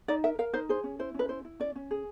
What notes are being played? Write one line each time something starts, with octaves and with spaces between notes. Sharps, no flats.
D#4 D5
A#4 E5
A#4 F5
D#4 C5
G#4 C5
C#4
E4 C5
C#4 B4
E4 C5
E4
C#4 D5
C#4
G#4